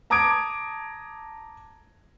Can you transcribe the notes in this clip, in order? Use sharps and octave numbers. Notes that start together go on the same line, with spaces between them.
A5 A#5 D6 D#6 G#6 D7